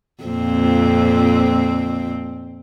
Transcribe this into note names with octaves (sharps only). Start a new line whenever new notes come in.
F2 A#2 C4